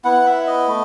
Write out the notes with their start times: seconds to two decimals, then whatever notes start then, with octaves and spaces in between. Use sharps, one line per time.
0.04 B3 E4 F#5
0.26 E5
0.47 D#5
0.68 A3